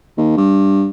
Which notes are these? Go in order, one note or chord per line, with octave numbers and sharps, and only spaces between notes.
D#2
G2